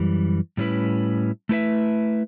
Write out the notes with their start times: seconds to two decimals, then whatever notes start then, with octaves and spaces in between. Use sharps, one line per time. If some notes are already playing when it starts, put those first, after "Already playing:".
Already playing: F#2 E3 G3
0.57 A2 G3 C#4 E4 B4
1.49 A3 E4 B4 E5